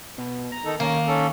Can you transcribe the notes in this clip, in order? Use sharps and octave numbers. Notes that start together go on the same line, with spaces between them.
B2
A#5
D#3 D#4 A4
D#3 A#3 C#4 A#4
C#4 A4